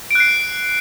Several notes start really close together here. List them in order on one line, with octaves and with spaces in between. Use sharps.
D7 F#6 C7